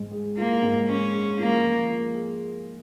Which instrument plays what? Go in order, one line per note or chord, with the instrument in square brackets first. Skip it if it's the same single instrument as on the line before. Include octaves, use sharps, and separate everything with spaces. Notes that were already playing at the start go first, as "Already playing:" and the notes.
Already playing: [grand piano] G#2 G#3
G#4
[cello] A#3 [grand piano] F4
[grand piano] G#2
[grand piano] G#3 [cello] C#4
[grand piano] G#4
[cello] A#3 [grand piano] F4
[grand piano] F3
A#3
G#4